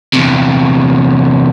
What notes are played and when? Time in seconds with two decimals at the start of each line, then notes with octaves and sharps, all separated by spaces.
0.13 E2 C3